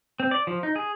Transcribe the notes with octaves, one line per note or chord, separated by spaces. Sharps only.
C4
D5
F3
D#4
G#4